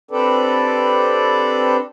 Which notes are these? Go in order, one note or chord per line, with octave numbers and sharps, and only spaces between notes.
C4 D4 G4 A4 B4 D5